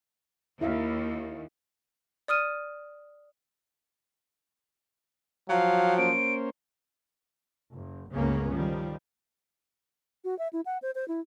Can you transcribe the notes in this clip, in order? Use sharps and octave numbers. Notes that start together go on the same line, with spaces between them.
D#2 E4 E5 F5
D5 D#6 F6 D#7
F3 F#3 F5 G5
A#3 C#4 C5 D7
F#1
G1 C#2 C#3 A#3 B3 C#4
D#3 F3 G3
F#4
E5
E4
F#5
C5
C5
E4